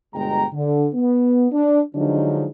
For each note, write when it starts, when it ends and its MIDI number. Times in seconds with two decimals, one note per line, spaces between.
0.15 0.45 31
0.15 0.45 47
0.15 0.45 56
0.15 0.45 79
0.15 0.45 82
0.53 0.88 50
0.94 1.47 59
1.53 1.80 62
1.95 2.47 50
1.95 2.47 53
1.95 2.47 54
1.95 2.47 56
1.95 2.47 62
1.95 2.47 63